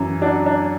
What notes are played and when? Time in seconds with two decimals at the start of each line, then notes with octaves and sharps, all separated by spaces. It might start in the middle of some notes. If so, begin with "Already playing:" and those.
Already playing: F#2 E3
0.21 F#3 D4
0.46 D4